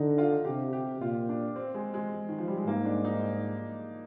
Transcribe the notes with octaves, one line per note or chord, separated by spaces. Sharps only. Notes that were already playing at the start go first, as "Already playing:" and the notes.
Already playing: D3 D4 D#4
F4
C3 G4
G4
A#2 F4
D4
C4
G#3
G#3
D#3
F3
G3
G#3
G#2 A#3
D4
D#4